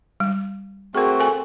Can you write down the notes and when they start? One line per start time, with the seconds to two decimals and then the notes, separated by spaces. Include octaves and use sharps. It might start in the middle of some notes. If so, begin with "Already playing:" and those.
0.20 G3
0.95 A3 C4 F#4 G#4 A#4
1.20 A4 G#5